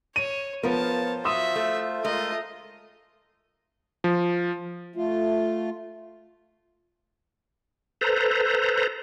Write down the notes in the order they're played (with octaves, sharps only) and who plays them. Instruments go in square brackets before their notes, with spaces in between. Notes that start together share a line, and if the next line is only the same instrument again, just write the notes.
[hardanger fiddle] C#5 [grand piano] D#7
[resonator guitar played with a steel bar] F3 A#4 [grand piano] B3 [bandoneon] F4 C5 [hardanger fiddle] C#5 A5
[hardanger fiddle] F#4 E5 [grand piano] C6 D#6 E7
[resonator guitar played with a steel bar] A3
[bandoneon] G#3 A#4 [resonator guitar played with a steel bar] A3 [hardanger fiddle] F4 D#5
[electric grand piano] F3
[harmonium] A3 F4
[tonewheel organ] A4 B4 C5 A#5